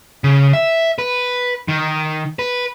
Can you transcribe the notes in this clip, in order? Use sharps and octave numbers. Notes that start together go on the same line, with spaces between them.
C#3
E5
B4
D#3
B4